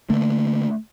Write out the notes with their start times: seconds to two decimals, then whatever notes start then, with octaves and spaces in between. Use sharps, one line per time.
0.10 D3 A3 A#3